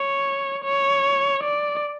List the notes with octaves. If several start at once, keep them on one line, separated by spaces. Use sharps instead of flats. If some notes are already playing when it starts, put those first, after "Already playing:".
Already playing: C#5
C#5
D5